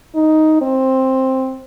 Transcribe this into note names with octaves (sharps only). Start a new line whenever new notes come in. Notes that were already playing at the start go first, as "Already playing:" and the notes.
D#4
C4